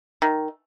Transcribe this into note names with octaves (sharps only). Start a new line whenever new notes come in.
D#3